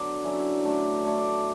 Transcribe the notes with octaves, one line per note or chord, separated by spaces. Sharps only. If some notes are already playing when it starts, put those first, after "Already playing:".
Already playing: D3 F#3 B3 D5
D3 F#3 C#4 E4
D3 A3 D4
D3 A3 D4 C#5
D5